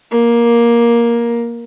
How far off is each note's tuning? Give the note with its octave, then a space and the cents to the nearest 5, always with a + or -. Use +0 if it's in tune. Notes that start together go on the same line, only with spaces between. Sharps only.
A#3 +10